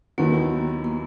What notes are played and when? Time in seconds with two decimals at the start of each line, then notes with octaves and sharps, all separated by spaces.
0.18 D#2 D#3 F#3 A#3 B3 E4
0.84 A#3